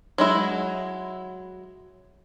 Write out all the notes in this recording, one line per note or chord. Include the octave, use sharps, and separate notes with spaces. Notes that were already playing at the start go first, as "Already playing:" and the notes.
F#3 G#3 E4